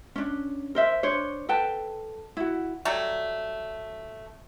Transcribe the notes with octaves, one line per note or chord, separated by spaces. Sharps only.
C#4 D4
A#4 C5 E5
D4 C5 C#5
A4 B4 G5 A5
E4 F#4
F#3 G3 A3